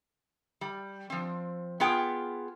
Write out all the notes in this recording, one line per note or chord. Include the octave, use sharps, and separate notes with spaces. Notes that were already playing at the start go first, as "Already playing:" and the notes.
G3
F3 C4
B3 F4 G#4 G5